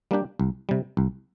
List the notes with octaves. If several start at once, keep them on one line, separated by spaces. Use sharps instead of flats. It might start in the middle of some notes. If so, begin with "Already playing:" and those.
G3 A#3 D4 G4
C2
C3 G3
C2